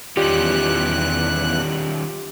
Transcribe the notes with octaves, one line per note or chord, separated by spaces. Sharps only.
E2 D#3 G3 C#4 F4 G4 D5 F#6